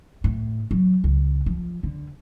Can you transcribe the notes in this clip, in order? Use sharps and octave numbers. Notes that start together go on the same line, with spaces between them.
A2
F#3
C#2
F3
D3